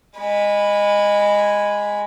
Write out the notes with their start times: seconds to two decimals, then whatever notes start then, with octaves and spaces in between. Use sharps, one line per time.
0.17 G#3 B5